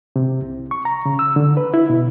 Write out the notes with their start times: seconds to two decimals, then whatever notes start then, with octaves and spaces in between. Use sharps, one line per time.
0.16 C3
0.42 C2
0.71 C#6
0.85 A#5
1.06 C#3
1.19 E6
1.36 D3
1.57 B4
1.74 E4
1.90 B2